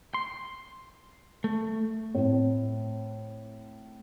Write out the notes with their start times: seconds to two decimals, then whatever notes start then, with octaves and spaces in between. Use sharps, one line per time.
0.14 C6
1.44 A3
2.15 A2 C4